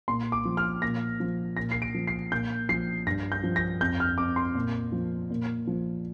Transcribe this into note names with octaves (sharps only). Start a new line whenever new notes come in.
A#2 C6
D6
F3
F6
A#2 A#6
F3
A#2 A#6
C7
D7
F3
C7
A#2 G6
F3 C7
G2 A#6
G6
F3
A#6
F2 G6
F6
F2 D6
C6
A#2
F3
A#2
F3